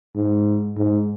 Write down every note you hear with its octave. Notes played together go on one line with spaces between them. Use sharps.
G#2
G#2